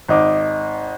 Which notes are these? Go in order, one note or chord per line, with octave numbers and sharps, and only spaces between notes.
G#1 D#4 D6